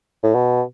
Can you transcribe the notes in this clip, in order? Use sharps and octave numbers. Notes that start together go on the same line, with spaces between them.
A2
B2